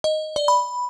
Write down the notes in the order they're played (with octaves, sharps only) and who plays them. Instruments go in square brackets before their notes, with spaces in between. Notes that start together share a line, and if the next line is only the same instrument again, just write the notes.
[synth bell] D#5
D5
B5